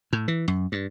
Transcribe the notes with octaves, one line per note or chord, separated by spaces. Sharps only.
A2
E3
F#2
G2